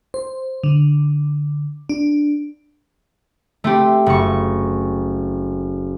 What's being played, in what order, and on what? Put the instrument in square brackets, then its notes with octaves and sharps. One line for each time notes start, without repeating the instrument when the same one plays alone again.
[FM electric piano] C5
D3
D4
[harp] A3 C4 G4
F#1 C#6